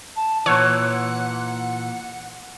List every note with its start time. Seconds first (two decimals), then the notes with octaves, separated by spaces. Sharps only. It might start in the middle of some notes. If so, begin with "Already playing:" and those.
0.16 A5
0.46 A#2 E3 C#5 F#5